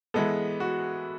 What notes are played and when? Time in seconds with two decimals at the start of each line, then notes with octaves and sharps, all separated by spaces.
0.14 E3 G#3 B3 A4
0.60 F#4